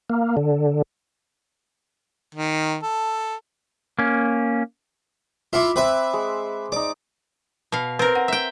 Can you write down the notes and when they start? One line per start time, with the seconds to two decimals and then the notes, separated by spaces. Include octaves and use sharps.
0.10 A#3
0.37 D3
2.35 D#3
2.83 A4
3.99 A#3 C#4
5.53 E4 F4 E5 C6 D6
5.76 C4 B4 C5 E5 E6
6.13 G#3
6.72 D#4 D5 D6
7.72 B2 F5
7.99 C4 A#4 B4
8.15 F#5
8.28 E5 G5